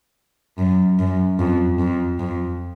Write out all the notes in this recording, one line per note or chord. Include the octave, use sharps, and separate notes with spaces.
F#2
F#2
F2
F2
F2